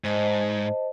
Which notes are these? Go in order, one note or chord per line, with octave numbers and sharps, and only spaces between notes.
G#2 C5 D#5 A5